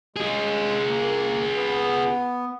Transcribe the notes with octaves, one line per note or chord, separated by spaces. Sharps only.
G#3 F4 G#4
A#3
B3